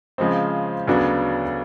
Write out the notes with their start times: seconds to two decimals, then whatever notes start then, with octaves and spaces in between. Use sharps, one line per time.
0.18 C#3 F3 G#3 C4
0.87 D2 C#3 F#3 B3 D4